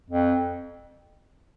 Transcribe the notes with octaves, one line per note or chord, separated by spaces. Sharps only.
F2